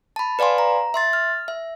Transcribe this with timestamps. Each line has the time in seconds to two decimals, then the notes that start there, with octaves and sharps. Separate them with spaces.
0.16 A5 B5
0.39 B4 D5 F5 G#5 C6
0.58 A#5
0.94 E5 C6 A6
1.13 F6
1.48 E5